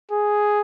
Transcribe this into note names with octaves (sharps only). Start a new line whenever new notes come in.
G#4